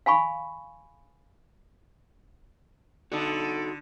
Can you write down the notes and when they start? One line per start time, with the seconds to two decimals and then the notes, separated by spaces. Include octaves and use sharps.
0.06 F5 G#5 B5 C#6
3.12 D3 D#4 F#4 A4